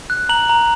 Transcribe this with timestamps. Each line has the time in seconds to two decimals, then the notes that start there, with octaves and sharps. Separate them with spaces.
0.10 F#6
0.29 A#5 F#7
0.49 A#5